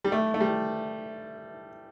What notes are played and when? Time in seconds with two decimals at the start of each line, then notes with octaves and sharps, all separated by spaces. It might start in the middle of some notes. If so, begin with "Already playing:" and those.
0.04 G3
0.12 A3
0.34 A3
0.40 G3